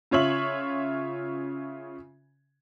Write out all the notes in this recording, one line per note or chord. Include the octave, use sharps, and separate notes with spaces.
C#3 F4 C#5 E5 F#7